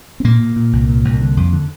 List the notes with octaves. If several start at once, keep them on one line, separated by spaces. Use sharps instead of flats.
C4
A#2 A#3
A#2
A#2
C2
A#2
C2
D3
F2
D3